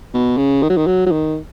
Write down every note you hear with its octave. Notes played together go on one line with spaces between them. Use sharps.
B2
C#3
D#3
F#3
D#3
F#3
F#3
D#3